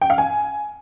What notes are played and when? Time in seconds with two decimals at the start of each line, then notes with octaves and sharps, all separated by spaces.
0.01 G5
0.10 F5
0.18 G#5